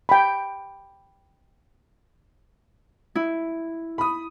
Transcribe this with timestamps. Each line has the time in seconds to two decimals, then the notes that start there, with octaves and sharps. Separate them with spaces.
0.09 G5 B5
3.15 E4
3.98 B5 D#6